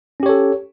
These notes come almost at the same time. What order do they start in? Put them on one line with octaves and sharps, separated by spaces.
C#4 G4 C#5 A4